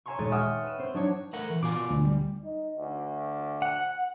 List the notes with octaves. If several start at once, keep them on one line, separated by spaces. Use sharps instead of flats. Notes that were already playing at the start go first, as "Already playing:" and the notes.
C#5 E5 G#5 A#5 C6 C#6
D#1 G#3 C#5 A6 D#7
E5 F#5 G5 C#6 D#6 F6
B4 D#7 E7
C4 C5
F#3 D4 D#4 C#5
A3 A#4 F#5
E3
B2 F4 G#5 D6
D2
G3
D#4
D2
F#5